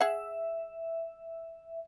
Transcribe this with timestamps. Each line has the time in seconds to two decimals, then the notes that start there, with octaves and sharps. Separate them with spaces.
0.01 G#4 E5 F#5